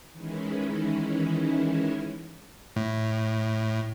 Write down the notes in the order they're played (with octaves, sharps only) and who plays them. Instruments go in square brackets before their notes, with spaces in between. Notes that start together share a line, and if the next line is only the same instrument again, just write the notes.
[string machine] D#3 E3 G#3 C#4 E4
[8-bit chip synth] A2